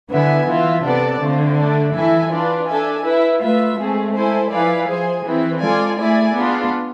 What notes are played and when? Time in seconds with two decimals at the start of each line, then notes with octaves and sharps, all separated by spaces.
0.10 D3 B3 E4 B4 E5 G#5
0.48 E3 F4 B4 E5
0.84 C3 B3 D4 A4 D5 A5
1.20 D3 A3 C4 F4
1.58 A3 D4 A4 D5
1.94 E3 E4 A4 E5 G#5
2.31 D4 F4 B4 D5
2.68 D4 A4 E5 G#5
3.04 E4 B4 E5
3.41 A3 F4 B4 E5
3.77 G#3 A3 C4 G#4
4.14 E4 A4 C5 G#5
4.52 F3 E4 B4 D5 F5 G#5
4.88 F3 G#4 C5 G#5
5.25 E3 C4 E4 G#4 B4
5.61 G#3 F4 A4 D5 G#5
5.98 A3 E4 G#4 D5 G#5
6.34 B3 D4 F4 G#4